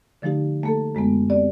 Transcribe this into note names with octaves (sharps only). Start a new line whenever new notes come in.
D3 F3 A3 D#4 G4
A3 A#3 A4
F#2 G#3 A3 B3
C4 G4 D5